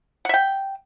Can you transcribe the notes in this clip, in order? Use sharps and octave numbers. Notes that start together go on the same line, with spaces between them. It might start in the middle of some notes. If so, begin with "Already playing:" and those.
E5 F#5 G5